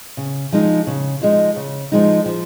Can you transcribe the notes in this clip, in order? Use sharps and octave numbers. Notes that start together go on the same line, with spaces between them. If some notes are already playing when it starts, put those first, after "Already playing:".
C#3
F3 G#3 D#4
C#3
F3 G#3 D#4
C#3
F3 G#3 D#4
F3